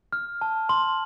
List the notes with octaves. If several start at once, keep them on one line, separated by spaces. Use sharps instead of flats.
F6
A5
C6